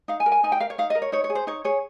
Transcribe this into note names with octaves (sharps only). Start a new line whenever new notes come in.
D#4 F5
G#5
A#4
G#5
D#4 G#5
G5
A#4 F5
C#5
D#4 F5
D#5
A#4
C#5
D#4 C#5
C#5
G#4
C5
D#4 C#5
G#4 C#5